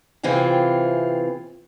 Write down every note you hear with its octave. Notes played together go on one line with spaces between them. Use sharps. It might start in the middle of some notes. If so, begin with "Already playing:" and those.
C3 E3 C4 F4 G#4